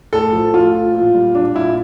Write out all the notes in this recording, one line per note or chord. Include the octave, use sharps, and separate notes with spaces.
A2 A4
F3
A2 F4
F3
A#2
G3
A#2 D4
A#2 E4